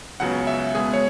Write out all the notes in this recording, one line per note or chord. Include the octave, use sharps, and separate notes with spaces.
C#2 C#3 F#3 B3 F#5
E5
B2 G#3 B3 G#4
C#5